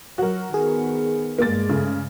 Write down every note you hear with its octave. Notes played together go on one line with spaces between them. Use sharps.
F#3 F#4 A#4
D#3 B3 G#4
G2 G#3 A#3 A6
C#3 A3